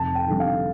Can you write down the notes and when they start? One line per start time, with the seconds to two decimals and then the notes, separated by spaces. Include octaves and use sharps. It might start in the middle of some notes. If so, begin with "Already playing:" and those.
Already playing: F1 A5
0.15 G5
0.28 F2 D3 G3
0.40 F5